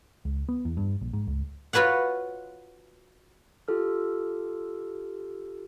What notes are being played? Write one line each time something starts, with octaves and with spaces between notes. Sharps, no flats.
C#2
B3
E2
G2
A#1
G#2
C#2
F4 F#4 B4 C#5 F#5
F4 G4 A4 F6